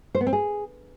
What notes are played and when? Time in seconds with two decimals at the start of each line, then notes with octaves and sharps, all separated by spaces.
0.15 C5
0.21 B3
0.27 C4
0.33 G#4